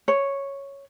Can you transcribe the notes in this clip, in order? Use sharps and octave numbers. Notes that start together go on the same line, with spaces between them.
C#5